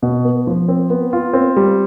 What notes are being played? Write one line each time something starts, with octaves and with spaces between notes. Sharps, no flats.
B2
B3
F3
C4
B3
F4
C4
G3